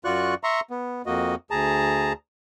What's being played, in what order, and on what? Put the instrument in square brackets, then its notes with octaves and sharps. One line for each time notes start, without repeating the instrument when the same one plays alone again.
[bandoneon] F#2 F4 F#4 D5 C#6 F#6
E5 A#5 C6 C#6
B3
F2 A#3 F#4 D#5
D2 G#4 A5 A#5